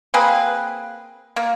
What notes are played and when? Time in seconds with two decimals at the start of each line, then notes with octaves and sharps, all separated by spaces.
0.14 A#3 C4 G#4 B4
1.36 A#3